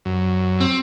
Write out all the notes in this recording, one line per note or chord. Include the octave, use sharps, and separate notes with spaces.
F#2
C4